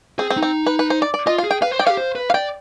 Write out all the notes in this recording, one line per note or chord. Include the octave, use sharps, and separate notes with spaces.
C4 G#4
C4
D#4
C4
B4
B4
C5
D5
D5
F4 D#5
F5
G#4
G5
B4 F5
C5
D5 G5
G4 F5
C5
B4
F5
D5 G5